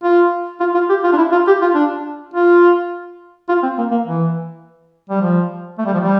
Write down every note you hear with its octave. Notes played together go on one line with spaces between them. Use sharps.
F4
F4
F4
G4
F4
D4
E4
F4
G4
F4
D4
F4
F4
C4
A#3
A#3
E3
G3
F3
A3
G3
F3
G3